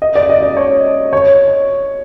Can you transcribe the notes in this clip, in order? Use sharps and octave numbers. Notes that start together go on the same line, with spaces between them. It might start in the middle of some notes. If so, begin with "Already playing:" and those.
D#5
D5
D#5
D5
C#5
C#5